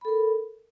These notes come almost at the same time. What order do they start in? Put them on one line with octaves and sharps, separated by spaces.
B5 A4 A#4